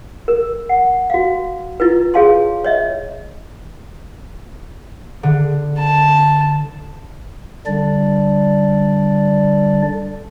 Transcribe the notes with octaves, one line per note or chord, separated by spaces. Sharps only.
A#4
F#5
F#4 F5
E4 F4 B4
G#4 C#5 F5 A5 C6
C#5 D#5 E5
D3
A5
D3 G3 D4 D5